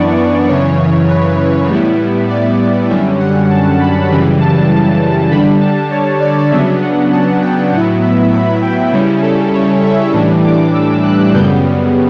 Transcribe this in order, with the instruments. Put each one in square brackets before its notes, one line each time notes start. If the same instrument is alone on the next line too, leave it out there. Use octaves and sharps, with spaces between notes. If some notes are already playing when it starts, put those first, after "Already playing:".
Already playing: [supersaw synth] F#2 E3 B3 D4 D5 C#6
F#2 C#3 E3 C#5
B4
A2 G3 B3 E4
D5
F#2 D3 G3 C#4 E5
F#5
A5
B5
F#2 C#3 E3 G3 B5
A5
D3 G3 D4 B5
A5
C#5
D5
C#3 F#3 B3 D4 E5
F#5
A5
G5
A2 F#3 B3 E4 F#5
E5
B5
G5
C#3 G3 C#4 E4
A4
C#5
E5
A2 E3 G3 D4
D6
E6
F#6
F#2 C#3 G3 B3 G6